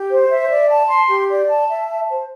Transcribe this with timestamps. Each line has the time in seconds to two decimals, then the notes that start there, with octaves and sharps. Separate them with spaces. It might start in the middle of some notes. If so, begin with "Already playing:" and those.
Already playing: G4
0.10 C5
0.30 E5
0.49 D5
0.68 A5
0.88 C6
1.09 G4
1.29 D5
1.48 A5
1.68 E5
1.87 A5
2.08 C5